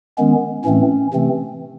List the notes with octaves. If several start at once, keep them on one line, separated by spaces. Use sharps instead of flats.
D#3 G#3 B3 C#4
A2 E3 A3 C4 C#4
C3 E3 A3 C4